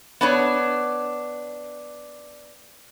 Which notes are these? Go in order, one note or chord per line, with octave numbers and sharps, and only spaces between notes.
B3 D4 C#5